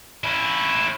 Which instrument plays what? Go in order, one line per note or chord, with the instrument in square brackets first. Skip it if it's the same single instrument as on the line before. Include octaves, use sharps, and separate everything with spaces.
[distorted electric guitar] C#4 E4